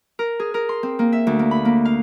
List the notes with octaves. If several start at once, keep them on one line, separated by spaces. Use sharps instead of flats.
A#4
G#4
A#4
C6
C4
A#3
E5
D2
A#3
B5
A#3
F5